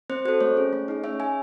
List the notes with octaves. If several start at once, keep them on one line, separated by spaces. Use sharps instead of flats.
C4 C5
F#4 A4 C5
A3 C#5
C#4 G#4
A3
D#4 G#4
C#4 C#5 E5
G#4 E5 G#5